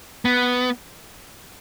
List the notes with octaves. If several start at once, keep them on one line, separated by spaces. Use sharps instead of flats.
B3